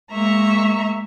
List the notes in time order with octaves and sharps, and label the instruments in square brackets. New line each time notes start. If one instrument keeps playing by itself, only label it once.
[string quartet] G#3 A#3 E5 A#5 C#6